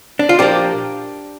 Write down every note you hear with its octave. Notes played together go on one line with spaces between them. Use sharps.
D4
F4
A#2 F3 A#3 D4 G4